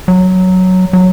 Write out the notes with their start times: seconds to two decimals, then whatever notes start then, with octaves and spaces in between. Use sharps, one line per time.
0.08 F#3
0.93 F#3